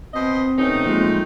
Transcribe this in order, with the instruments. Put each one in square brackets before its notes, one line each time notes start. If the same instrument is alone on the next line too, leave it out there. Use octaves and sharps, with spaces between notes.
[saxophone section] B2 C5 D#5 [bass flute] C4
[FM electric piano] C3 B3 C#4 [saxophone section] D#3 A3 D#4
[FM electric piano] A#2 F#3 [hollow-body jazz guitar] F3 G#3